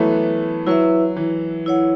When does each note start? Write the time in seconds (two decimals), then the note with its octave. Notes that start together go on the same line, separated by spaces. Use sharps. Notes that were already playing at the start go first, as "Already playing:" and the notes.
Already playing: E3 F#3 A3 B3
0.67 F#3 E4 B4 E5
1.16 E3
1.66 E4 C#5 F#5